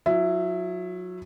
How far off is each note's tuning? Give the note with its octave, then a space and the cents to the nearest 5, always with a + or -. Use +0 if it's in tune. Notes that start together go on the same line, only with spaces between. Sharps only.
F#3 -25 E4 +15